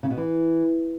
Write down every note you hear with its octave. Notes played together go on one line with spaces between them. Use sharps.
C#3
B2
E3